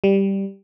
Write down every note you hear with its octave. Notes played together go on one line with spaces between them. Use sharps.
G3